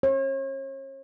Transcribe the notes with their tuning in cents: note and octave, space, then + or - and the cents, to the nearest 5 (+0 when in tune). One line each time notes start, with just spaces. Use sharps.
C#5 -40